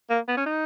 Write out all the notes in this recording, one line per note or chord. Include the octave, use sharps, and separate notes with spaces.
A#3
B3
C#4
D#4